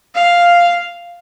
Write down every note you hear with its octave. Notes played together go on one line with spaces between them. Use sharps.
F5